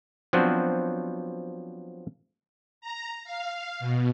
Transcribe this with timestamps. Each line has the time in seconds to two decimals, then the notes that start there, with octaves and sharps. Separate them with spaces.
0.33 F3 F#3 B3 C4 D4 F#4
2.81 A#5
3.24 F5
3.80 B2